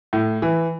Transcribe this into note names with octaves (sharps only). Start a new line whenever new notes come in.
A2
E3